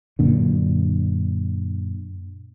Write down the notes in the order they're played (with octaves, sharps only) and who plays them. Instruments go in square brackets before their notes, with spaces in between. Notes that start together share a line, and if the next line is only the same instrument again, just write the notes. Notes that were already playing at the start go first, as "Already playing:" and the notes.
[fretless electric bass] F#2 A#2 D3